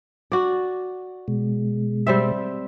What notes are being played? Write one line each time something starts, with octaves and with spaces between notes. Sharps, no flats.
F#4 D5
B2 G#3
G3 C4 E5